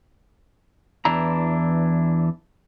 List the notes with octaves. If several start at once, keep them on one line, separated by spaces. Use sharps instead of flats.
E2 E3 D4 E4 A#5